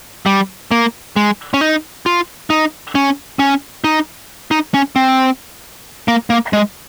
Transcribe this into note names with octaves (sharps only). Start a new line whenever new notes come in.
G3
A#3
G#3
C#4
D#4
F4
D#4
C#4
C#4
D#4
D#4
C#4
C4
A#3
A#3
G#3